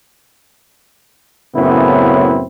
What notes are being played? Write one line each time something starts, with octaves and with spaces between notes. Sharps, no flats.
F#2 A2 C#3 B3 C4 E4